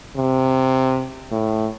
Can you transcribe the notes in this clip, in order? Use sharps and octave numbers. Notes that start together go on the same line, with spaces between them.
C3
A2